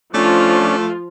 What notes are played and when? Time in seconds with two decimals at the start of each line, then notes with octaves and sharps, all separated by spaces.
0.14 F3 A3 C#4 D4 F4